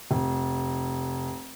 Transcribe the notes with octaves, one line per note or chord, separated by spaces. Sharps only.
F1